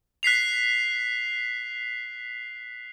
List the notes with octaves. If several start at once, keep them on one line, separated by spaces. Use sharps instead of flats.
F#6 B6 C7 F7